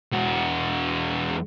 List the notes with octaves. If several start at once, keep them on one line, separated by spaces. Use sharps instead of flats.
E2 F#4